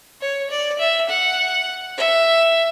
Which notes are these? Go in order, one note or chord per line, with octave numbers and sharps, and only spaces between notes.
C#5
D5
E5
F#5
E5